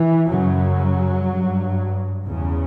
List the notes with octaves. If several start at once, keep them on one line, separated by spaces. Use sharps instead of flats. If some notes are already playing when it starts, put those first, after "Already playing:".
Already playing: E3
F#2 C#3 F#3
G2
E2 C#3